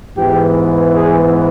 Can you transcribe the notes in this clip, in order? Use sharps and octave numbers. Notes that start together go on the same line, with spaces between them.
G#2 E3 G#3 B3 G4
G#4